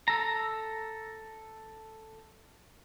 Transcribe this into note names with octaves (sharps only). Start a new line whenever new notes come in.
A4 A#5